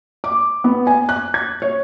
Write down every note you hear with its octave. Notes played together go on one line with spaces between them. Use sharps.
D6
B3
G#5
F#6
G#6
C#5